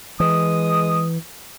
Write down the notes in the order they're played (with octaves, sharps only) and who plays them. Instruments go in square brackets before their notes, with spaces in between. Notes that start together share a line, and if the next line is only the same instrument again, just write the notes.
[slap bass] E3 [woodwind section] G#3 D#6